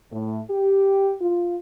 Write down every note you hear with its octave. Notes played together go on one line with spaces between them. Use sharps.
A2
G4
F4